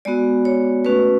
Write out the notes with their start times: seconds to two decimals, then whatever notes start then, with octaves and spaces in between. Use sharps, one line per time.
0.05 G#3 B3 F#4 D5
0.45 C#5
0.85 A3 C#4 F#4 B4